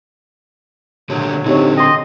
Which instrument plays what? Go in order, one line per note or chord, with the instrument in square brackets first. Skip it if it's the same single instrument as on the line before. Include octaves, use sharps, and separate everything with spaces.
[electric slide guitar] A#2 D3 G4 [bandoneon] F#3
[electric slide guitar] D3 C4 [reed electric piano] D#4 G4 C#5
[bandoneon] D#5 [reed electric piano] G5 C6